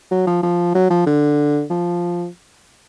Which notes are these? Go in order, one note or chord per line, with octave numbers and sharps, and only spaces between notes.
F#3
F3
F3
F#3
F3
D3
F3